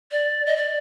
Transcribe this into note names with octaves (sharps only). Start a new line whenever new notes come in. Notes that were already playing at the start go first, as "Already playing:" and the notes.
D5
D#5
D5